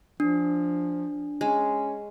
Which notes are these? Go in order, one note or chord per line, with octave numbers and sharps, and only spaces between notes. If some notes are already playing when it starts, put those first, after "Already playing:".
F3 D4
G#3 C#4